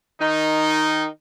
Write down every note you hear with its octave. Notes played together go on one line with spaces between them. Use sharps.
D#3 D#4